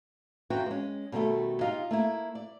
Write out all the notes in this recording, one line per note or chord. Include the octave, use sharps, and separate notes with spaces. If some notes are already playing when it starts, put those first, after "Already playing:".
F#2 E3 F4 F#4 G5
G#3 C#4
B2 D#3 G3 A3
D#4 F4 G4 D#5 F5
A3 A#3 E4
D5